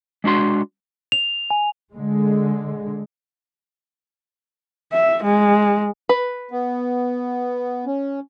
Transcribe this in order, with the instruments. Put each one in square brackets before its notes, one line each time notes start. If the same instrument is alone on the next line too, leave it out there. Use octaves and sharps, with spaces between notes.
[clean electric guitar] G#3 D4 F#4 C6
[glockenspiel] F7
G#5
[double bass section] D3 G#3
[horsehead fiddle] E5
G#3
[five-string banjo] B4
[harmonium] B3
C#4